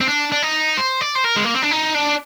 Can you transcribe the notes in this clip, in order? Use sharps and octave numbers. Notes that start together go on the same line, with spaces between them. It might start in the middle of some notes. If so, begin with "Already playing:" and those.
C4
D4
D4
D#4
C5
D5
C5
A#4
G#3
A#3
C4
D4
D#4
D4